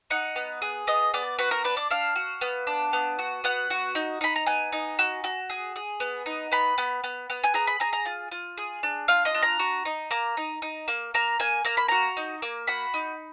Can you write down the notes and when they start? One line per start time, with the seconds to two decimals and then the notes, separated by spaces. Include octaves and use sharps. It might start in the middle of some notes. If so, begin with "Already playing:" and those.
0.10 D#4 F#5
0.36 B3
0.62 G#4
0.87 B3 D#5
1.14 B3 D5
1.39 F#4 B4
1.51 A#4
1.64 D4 B4
1.77 D5
1.90 D4 F5
2.16 F#4
2.41 B3
2.67 D4
2.93 B3
3.19 F#4
3.44 B3 F#5
3.70 F#4
3.95 D#4
4.21 D#4 B5
4.36 A#5
4.46 B3 G#5
4.72 D#4
4.99 F#4
5.24 F#4
5.50 G#4
5.76 G#4
6.00 B3
6.26 D#4
6.52 B3 B5
6.78 B3
7.04 B3
7.30 B3
7.44 G#5
7.54 G#4 A#5
7.67 B5
7.80 G#4 A#5
7.93 A#5
8.05 F4
8.32 F4
8.58 G#4
8.83 D4
9.08 F4 F5
9.25 D#5
9.34 D4
9.43 A#5
9.59 F#4
9.85 D#4
10.11 A#3 A#5
10.37 D#4
10.62 D#4
10.88 A#3
11.14 A#3 A#5
11.40 A#3 G#5
11.65 A#3 A#5
11.77 B5
11.88 F#4 A#5
12.17 D#4
12.42 A#3
12.67 F#4 B5
12.94 D#4